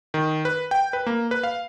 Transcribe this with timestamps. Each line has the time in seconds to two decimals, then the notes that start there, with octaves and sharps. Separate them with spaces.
0.14 D#3
0.45 B4
0.71 G5
0.93 B4
1.06 A#3
1.31 B4
1.44 F5